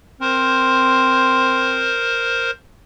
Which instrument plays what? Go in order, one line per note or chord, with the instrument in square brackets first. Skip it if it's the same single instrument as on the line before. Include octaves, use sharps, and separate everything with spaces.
[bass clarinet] C4 [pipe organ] A#4 C5